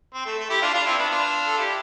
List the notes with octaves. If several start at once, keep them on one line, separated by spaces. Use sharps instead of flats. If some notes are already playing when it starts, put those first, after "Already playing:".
C4
A3
A3
E4 G4
D4 F4
D4 F4
C4 E4
B3 D4
D4 F4
A4
E4 G4